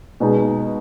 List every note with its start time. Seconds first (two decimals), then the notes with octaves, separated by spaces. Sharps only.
0.20 B2 G#3 B3 D#4